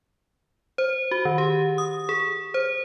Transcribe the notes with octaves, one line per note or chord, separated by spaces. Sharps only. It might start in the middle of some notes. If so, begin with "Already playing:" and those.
C5
F#4
D#3
G4
D#6
G#4
C5